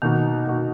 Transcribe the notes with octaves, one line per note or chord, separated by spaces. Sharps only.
B2 D#3 A#3 D#4 F#4
B2 A#3 D#4 F#4